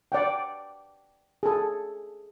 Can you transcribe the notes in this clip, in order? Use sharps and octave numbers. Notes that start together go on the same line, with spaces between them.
D5 F#5 G5
G#4 A4